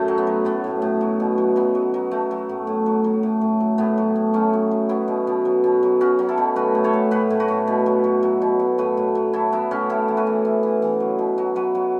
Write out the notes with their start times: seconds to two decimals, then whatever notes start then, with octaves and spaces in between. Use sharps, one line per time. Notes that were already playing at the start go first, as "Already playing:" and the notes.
Already playing: F#2 A2 A3
0.08 F#3
0.18 B3
0.27 F#3
0.45 A2 B3
0.64 A2
0.82 A2
1.01 F#3
1.20 B2
1.38 F#3
1.56 F#3 B3
1.75 F#3
1.94 F#3
2.11 F#3 A3
2.31 F#3
2.49 A2
2.67 A2
2.86 F#3
3.04 F#3
3.23 A2
3.41 A2
3.60 F#3
3.78 A2 B3
3.98 F#3
4.16 A2
4.34 F#3 A3 C#4
4.53 F#3
4.71 F#3
4.89 F#3 B3 E4
5.08 B2
5.27 B2
5.45 F#3
5.64 B2
5.83 F#3
6.01 F#3 C#4 F#4
6.19 F#3
6.28 E4 A4
6.38 B2
6.56 A2 F#4 B4
6.75 A2
6.84 A4 C#5
6.93 A2
7.11 A2 F#4 B4
7.30 A2
7.40 F#4 B4
7.48 A2
7.67 B2
7.86 F#3
8.04 F#3
8.23 F#3
8.42 B2
8.60 B2
8.78 A2 F#4 B4
8.97 A2
9.15 F#3
9.33 F#3 E4 A4
9.52 F#3 B3 E4
9.71 A2 C#4 F#4
9.90 A2 E4 A4
10.08 E3
10.17 F#4 B4
10.27 E3
10.45 E3
10.63 E3
10.82 E3
11.00 F#3
11.19 B2
11.38 F#3
11.56 F#3 F#4 B4
11.75 F#3